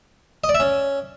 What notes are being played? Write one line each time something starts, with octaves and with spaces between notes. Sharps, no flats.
D#5
D5
E5
C#4